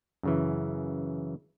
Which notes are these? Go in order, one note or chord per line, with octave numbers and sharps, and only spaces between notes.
F#2 C#3 E3